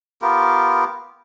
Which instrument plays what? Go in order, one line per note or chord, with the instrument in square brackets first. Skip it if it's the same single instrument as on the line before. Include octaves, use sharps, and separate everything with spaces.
[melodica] B3 F4 G4 A#4